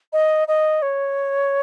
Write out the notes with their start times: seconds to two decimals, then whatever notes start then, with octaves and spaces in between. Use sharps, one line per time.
0.13 D#5
0.48 D#5
0.82 C#5